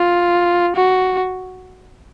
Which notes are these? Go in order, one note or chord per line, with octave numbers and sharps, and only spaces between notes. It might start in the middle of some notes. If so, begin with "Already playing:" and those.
Already playing: F4
F#4